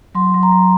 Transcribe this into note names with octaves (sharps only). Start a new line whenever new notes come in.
F#3 C6
F#3
A#5
F#3